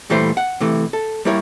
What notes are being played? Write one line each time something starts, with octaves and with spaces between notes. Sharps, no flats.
A#2 E3 G3 A3 C5
F#5
C3 E3 A3
A4
G3 A#3 E4 A#4 C#5